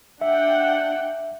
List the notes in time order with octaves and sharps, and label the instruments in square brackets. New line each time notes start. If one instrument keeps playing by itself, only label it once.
[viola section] D4 F#5 G5 [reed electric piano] E5